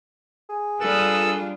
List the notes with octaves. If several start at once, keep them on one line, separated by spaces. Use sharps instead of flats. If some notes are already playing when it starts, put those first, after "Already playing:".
G#4
G3 D4 F4 A4 B4 D#6 E6